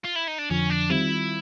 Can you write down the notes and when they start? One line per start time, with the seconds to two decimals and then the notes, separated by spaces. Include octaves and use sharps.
0.04 F4
0.15 E4
0.27 D#4
0.38 D4
0.50 F2 D3 F3 C#4
0.70 D4
0.90 D#3 G3 C4 E4 F4